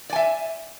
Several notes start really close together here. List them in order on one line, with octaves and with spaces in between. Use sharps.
D5 G#5 E5